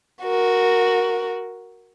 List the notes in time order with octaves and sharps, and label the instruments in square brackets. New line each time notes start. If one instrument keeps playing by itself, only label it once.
[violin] F#4 A#4